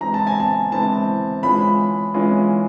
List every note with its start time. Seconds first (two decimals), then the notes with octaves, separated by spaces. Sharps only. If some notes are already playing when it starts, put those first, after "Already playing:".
0.01 E3 G#3 C4 E4 A#5
0.14 A5
0.27 G#5
0.40 A5
0.72 E3 G#3 C4 E4 A5
1.43 E3 G#3 C#4 F4 B5
2.14 E3 G#3 C#4 F4